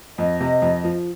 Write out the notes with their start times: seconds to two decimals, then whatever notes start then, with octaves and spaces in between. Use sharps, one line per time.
0.18 F2 D#5
0.40 C3
0.62 F2
0.84 F3